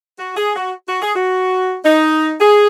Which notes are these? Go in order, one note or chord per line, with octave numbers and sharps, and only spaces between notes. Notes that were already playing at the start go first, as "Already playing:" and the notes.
F#4
G#4
F#4
F#4
G#4
F#4
D#4
G#4